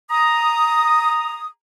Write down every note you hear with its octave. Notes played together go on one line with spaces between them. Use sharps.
A#5 D#6